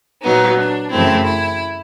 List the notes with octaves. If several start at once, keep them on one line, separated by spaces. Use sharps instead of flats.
A#2 F#3 B3 D#4
D4
F#2 C#3 E3 A3 C4 E4
E4